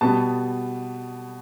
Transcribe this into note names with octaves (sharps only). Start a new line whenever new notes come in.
B2 G3 B3 A5